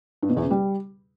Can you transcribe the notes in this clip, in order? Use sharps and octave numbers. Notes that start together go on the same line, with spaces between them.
G2
B2
E2
C#3
G3